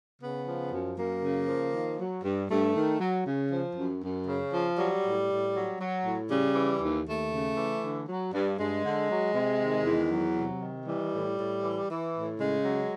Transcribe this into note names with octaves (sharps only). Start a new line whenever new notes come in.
C#3 B3
F3
F#2
F#2 A#3
C#3
F3
D#3
F#3
G2
G2 A3
D#3
F#3
C#3
F3
F#2
F#2
C#3
F3
F#3 G3
A2
A2
F#3
F#3
A2
C#3 G3
E3
D#2
D#2 A3
C#3
E3
D3
F#3
G2
G2 G#3
D3
F#3
C3
D#3
E2
F#3
C3
D#3
E3 G3
A2
A2
E3
E3
A2
C#3 G#3
F#3